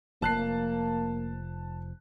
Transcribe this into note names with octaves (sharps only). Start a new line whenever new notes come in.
F1 F3 A#3 A5 F#6 C7